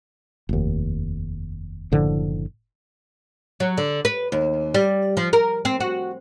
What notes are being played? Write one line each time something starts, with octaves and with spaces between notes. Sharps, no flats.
F1 D#2
F#1 A2 D3 F3
F#3
D3
B4
D#2
G3
F3
A#4
C4
F#4